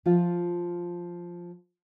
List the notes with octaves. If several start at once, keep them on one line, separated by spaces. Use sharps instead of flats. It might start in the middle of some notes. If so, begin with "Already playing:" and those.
F3 F4